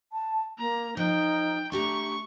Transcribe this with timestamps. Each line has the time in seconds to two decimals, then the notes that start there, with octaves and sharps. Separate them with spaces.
0.13 A5
0.59 A#3 A#5
0.97 F3 D#4 G5
1.72 A3 D4 G4 A#5 C#6